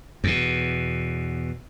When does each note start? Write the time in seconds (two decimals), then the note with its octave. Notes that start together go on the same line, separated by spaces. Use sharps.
0.24 E2 B2